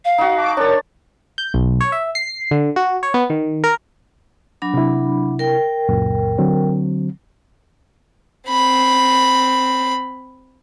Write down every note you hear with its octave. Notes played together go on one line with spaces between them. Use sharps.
F5
D#4 F#4
A5 D6
D4 A#4 C#5 A5
G6
B1
C#5
E5
C7
D3
F#4
C#5
B3
D#3
A#4
F#3 D4 B5
C3 E4
A#4 G5
C#2 F#2 A#2
D3 F#3 C4
C4 B5